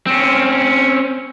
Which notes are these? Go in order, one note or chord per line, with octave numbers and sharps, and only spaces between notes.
C4 C#4